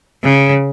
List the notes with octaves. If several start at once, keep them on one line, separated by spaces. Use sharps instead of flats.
C#3